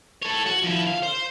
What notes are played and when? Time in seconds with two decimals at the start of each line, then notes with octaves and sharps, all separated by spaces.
0.23 A4 C#5
0.46 F#4
0.64 F3 E4
0.87 F5
1.03 C5